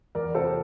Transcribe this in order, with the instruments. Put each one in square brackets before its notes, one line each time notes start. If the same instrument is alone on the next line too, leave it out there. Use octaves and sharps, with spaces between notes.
[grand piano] E2 [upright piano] A#4 D5
[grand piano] C3 [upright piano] A4 C5